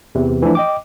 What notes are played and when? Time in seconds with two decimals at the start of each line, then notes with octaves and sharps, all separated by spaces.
0.15 E2 C3 E3
0.42 E3 F3 A3 D4 E4
0.55 D#5 G5 D6